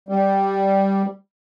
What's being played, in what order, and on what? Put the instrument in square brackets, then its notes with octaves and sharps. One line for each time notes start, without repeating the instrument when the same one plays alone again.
[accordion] G3